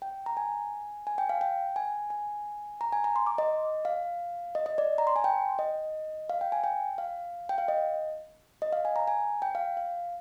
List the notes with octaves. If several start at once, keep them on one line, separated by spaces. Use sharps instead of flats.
G5
A#5
G#5
G#5
G5
F5
G5
G#5
G#5
A#5
G#5
A#5
C6
D6
D#5
F5
D#5
D#5
D5
A#5
C6
G#5
G5
D#5
F5
G5
G#5
G5
F5
G5
F5
D#5
D#5
F5
G#5
A#5
G#5
G5
F5
F5